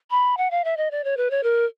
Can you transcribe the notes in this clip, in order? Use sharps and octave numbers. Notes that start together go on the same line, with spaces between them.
B5
F#5
F5
E5
D#5
D5
C#5
B4
C#5
A#4